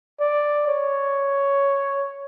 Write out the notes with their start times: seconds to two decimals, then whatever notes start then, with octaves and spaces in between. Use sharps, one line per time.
0.20 D5
0.68 C#5